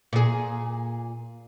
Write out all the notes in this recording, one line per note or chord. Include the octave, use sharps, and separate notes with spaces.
A#2 G#4